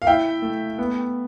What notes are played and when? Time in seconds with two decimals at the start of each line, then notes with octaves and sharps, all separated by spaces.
0.02 F5
0.06 E4 E5 G5
0.42 A3
0.78 B3